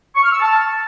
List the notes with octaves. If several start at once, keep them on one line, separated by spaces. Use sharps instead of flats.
C#6
F6
E6
A5